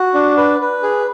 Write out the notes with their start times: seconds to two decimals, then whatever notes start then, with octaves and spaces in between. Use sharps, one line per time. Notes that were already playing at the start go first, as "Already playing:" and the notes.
Already playing: F#4
0.14 D4
0.37 B4
0.61 B4
0.83 G#4